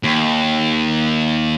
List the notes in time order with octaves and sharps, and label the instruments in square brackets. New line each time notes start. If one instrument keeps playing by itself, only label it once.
[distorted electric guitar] D#2